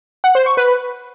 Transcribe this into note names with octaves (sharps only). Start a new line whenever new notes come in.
F#5
C5
C#6
B4